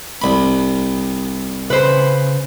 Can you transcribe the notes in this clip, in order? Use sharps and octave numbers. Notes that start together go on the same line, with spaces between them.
C2 B5
C#3 B4 C5